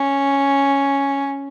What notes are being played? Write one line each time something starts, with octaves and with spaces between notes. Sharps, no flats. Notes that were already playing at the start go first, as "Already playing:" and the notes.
Already playing: C#4